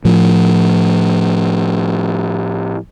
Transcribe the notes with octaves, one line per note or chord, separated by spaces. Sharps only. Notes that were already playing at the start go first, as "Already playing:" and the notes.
A2 F3